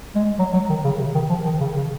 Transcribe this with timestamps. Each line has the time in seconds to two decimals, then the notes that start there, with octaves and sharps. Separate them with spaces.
0.15 G#3
0.39 F#3
0.53 F#3
0.70 D#3
0.84 C#3
0.99 C3
1.15 D#3
1.30 F3
1.45 D#3
1.61 C#3
1.76 C#3